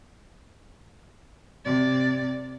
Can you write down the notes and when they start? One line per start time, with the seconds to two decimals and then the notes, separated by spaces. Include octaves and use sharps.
1.65 C3 D5